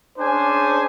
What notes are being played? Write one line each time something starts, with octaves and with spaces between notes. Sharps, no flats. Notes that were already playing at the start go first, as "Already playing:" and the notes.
C#4 D4 G#4 C5 G#5